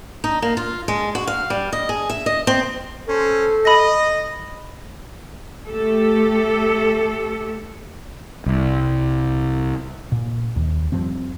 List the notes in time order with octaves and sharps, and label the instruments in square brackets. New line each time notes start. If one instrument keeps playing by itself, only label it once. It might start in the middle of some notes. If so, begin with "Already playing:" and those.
[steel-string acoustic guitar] D#4
A#3
F4
G#3
F#4
F5
G3
D#5
G#4
E5
D#5
C4
[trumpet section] C#4 C5 [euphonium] A4
[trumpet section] D#5 [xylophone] B5 A#6
[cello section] A3 G4 A4
[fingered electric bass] C2
[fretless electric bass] A#2
D#2
F2 F3 G3 C4